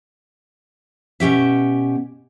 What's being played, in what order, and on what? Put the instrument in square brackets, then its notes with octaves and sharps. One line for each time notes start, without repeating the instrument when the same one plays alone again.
[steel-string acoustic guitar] B2 C#4 G4 E5